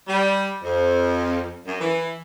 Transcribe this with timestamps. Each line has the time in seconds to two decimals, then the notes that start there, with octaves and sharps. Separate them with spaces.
0.08 G3
0.63 F2
1.68 F#2
1.81 E3